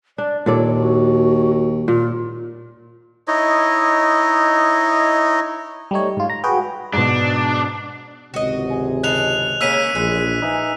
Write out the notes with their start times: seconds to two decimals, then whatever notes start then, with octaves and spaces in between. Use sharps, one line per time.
0.18 D4 D5
0.46 D#2 A#2 A4 C#5 D5
0.79 F#4
1.88 A#2 F4
3.28 D#4 E4 C#5 D#5
5.91 G3 A3 D#4 C#5
6.17 G#2 F4
6.30 A#5
6.44 F#4 G#4 B4 G5
6.93 G#2 B2 D4
8.34 G#1 C#2 C3 F#4 D#5
8.70 G#4
9.03 C#3 G#3 A4 F#6 F7
9.61 C#3 A#3 C#4 E6 B6 D#7
9.95 A#1 E3 G#3
10.42 D#4 B4 E5 G#5